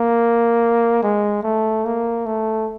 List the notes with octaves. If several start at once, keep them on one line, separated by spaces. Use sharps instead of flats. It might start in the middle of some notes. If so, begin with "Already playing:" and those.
Already playing: A#3
G#3
A3
A#3
A3